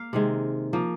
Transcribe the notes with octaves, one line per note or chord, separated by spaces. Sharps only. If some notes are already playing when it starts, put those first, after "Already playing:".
Already playing: A#3 F5
C3 D#3 G#3
F3 A#3